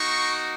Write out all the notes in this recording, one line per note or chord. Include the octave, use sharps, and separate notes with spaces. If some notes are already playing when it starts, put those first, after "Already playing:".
Already playing: A#3 D#4 F#4 C#6